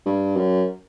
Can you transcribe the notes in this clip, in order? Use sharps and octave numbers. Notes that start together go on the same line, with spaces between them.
G2
F#2